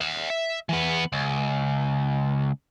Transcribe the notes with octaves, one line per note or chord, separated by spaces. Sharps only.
E5 F#5
E5
E3 B3
C#2